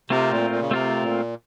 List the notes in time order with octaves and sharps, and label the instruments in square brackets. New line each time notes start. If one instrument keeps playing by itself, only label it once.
[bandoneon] C3 [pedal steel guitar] A3 C4 F4 A#4
[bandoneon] A#2
A#2
C#3
[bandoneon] C3 [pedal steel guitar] A3 C4 F4 A#4
[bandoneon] A#2